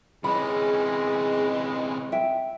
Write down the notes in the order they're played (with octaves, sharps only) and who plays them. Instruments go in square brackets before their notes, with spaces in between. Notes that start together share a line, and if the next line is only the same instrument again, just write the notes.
[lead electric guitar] C3 C#4 [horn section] E3 G#3 [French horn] G#4 [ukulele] B5
[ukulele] E5 G5